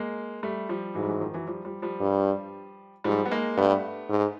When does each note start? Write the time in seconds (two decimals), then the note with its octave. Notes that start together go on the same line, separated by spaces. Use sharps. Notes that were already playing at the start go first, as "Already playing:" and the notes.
Already playing: G#3 A#3
0.43 G3 A3
0.69 F3 G3
0.95 G#2 E3 F#3
1.03 G3
1.09 E3 F#3
1.21 D#3 F3
1.34 E3 F#3
1.47 F3 G3
1.65 F3 G3
1.82 F3 G3
2.00 G2
3.04 G#2 F3 G3
3.26 B3
3.31 G#3 A#3
3.57 G2 A3 B3
4.09 G#2